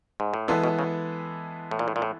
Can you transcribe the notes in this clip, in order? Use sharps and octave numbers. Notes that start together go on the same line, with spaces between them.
G#2
A2
A#2 E3 G#3 B3 E4 A4
B2
C#3
A2
A#2
A2
A#2
A2